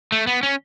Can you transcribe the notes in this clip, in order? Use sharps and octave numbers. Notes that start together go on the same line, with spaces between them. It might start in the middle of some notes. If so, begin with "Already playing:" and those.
A3
B3
C#4